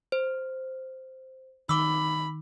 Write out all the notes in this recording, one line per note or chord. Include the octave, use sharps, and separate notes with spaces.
C5
D#3 B5 D6 E6